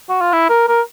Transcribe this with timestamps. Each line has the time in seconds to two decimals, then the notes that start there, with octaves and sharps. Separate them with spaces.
0.09 F#4
0.21 F4
0.33 E4
0.50 A#4
0.68 A#4